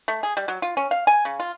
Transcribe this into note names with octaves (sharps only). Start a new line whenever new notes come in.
A3
G#4
G3
F#3
F4
C#4
F5
G#5
C#3
F4